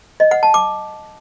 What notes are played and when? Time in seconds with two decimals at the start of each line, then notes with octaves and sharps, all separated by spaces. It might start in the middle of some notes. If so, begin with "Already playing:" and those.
0.20 D#5
0.31 F#5
0.43 A5
0.54 D6